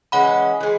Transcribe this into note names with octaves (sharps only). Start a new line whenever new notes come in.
E3 G#3 C#4 F#5 B5
E3 G#3